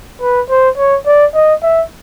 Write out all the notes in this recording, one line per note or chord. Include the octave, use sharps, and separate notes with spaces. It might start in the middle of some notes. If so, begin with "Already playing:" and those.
B4
C5
C#5
D5
D#5
E5